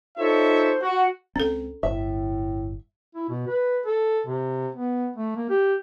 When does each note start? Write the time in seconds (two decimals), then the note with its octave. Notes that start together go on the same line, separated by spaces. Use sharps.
0.18 D#4 F4 A4 C5 C#5 E5
0.82 F#4
1.36 C#2 C4 C#4 A4
1.83 G1 A2 E5
3.15 E4
3.29 B2
3.47 B4
3.86 A4
4.27 C3
4.75 B3
5.16 A3
5.36 A#3
5.50 G4